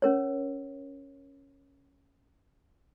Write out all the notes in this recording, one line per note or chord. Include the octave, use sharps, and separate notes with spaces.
C#4 A#4 C#5